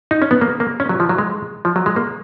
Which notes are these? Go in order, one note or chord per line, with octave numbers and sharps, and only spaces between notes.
D#4
C#4
B3
A#3
A#3
C#4
F#3
F3
F#3
G#3
F3
F#3
G#3
A#3